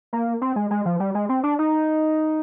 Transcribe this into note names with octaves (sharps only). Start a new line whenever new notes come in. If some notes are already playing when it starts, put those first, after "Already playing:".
A#3
C4
G#3
G#3
F3
G3
G#3
C4
D4
D#4